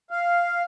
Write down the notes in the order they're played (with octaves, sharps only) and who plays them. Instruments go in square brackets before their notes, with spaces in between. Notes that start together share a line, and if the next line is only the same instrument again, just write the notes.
[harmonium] F5